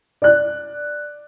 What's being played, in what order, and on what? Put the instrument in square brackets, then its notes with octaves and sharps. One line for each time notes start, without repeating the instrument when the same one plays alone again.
[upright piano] D5 F#6